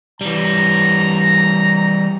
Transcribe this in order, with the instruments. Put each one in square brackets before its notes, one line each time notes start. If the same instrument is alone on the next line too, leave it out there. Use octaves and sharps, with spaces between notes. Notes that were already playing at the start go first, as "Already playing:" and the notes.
[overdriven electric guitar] E3 G3 [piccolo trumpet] A#5